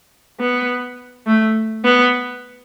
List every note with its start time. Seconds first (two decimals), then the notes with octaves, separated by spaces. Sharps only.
0.40 B3
1.27 A3
1.84 B3